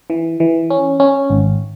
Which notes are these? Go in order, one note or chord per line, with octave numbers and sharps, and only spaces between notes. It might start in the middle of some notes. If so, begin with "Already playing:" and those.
E3
E3
C#4
C#4
G#1